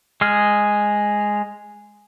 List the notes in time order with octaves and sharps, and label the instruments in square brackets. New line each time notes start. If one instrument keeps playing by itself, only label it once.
[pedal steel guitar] G#3 G#4 F6